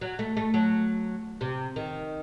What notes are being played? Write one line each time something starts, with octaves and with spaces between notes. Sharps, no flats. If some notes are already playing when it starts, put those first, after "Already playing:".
F#3
A3
A3
F#3
C3
D#3